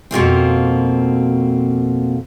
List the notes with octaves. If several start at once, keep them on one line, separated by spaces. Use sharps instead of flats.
F2 B2 A#3 C4